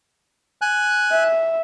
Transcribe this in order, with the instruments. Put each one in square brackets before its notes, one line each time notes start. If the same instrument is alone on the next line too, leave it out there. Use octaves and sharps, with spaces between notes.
[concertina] G#5 F#6
[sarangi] E5